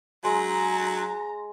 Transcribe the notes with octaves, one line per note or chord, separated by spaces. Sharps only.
F#3 G#3 A#5